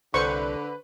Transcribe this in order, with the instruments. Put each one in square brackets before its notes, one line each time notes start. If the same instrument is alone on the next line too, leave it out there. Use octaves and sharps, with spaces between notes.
[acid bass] C2 [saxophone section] D3 [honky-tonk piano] B4 [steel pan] C5 C#6